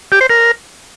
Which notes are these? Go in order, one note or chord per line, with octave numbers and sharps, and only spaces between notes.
G4
C5
A#4